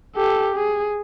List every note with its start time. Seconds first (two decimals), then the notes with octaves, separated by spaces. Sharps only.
0.16 G4 A4
0.56 G#4